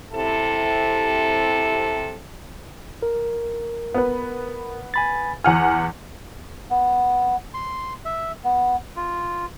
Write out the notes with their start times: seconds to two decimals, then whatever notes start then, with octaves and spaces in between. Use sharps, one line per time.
0.13 C3 E4 A4
3.03 A#4
3.94 B3 B4
4.94 G#5 B5 A6
5.44 E2 F#5 G#5 F6
6.70 B3
7.54 C6
8.05 E5
8.44 B3
8.96 F4